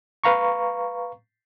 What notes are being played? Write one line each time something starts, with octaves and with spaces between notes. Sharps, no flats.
B4 F5 A#5 C#6